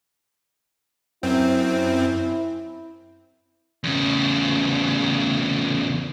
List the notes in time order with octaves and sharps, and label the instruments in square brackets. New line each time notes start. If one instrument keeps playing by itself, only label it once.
[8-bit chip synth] F#2 C4 [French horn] E4
[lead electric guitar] E2 C#3